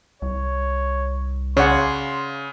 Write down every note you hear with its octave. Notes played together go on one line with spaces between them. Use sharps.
C2 C#5
C#3 C#5 D5 F#5 C6